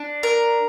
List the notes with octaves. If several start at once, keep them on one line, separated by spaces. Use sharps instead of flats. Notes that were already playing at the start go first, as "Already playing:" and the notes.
Already playing: D4
A#4